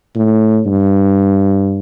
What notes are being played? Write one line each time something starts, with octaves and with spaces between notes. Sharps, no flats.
A2
G2